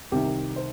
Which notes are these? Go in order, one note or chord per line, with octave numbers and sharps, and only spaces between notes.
C2 C3 D#3 G4
C5